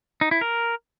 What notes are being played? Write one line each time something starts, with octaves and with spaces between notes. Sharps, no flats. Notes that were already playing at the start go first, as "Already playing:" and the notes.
D#4
E4
A#4